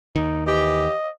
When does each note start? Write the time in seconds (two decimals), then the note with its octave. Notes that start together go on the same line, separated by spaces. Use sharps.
0.16 D#2 D#3 D#4
0.47 E3 G4 D#5